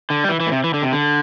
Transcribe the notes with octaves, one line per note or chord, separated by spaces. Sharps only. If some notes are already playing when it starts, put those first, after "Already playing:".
D3
G3
E3
E3
A2
C3
E3
D3
C3
D3